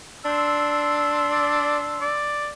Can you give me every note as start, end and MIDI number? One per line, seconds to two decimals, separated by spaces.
0.25 2.08 62
0.25 2.22 84
0.25 2.22 88
1.31 1.78 74
2.01 2.50 74